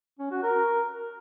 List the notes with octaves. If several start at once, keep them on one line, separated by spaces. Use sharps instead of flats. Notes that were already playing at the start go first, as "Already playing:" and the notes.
C#4
F#4
A#4